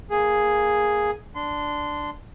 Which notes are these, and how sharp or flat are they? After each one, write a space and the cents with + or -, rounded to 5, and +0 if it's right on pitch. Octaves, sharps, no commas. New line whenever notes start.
A#3 +0 G#4 +0
D4 +0 C6 -20